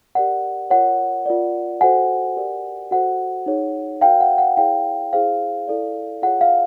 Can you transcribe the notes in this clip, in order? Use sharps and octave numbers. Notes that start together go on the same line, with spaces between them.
G4 A#4 D5 F#5
F4 A#4 C#5 F#5
F4 A#4 D5
F#4 A4 C5 F#5 G#5
G4 A#4 D5
F#4 A4 C5 F#5
D#4 G#4 C#5
F#4 A#4 C#5 F5 G5
F#5
F#5
E4 G#4 C#5 F5 G5
E4 G#4 C5 F5
E4 A4 D5
F4 G#4 C#5 F#5
F5